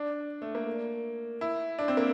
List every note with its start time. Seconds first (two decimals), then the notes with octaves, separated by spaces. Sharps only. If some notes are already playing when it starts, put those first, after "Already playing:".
Already playing: D4
0.42 A3
0.55 A#3
1.41 E4
1.79 D4
1.88 C4
1.97 A#3